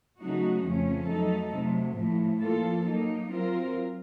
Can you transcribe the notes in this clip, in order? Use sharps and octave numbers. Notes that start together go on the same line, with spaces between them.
C#3 F#3 A3 D#4 F#4
F2 C#3 F3 A3 C#4
F#3 A3 D#4 A4
C3 F#3 A3
A2 F3 A3
F3 A#3 F4 A4
F#3 A#3 D#4
F#3 C4 F4 A#4